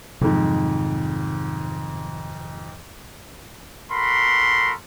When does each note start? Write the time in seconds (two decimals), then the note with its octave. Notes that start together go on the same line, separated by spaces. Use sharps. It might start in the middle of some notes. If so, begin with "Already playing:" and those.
0.21 F2 G#2 C3 D#3 F#3
3.91 F#4 A4 A#4 B5 C6